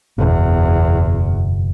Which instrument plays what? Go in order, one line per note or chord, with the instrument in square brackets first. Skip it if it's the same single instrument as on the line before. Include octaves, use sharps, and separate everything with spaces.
[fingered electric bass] F#1 B2 [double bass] E2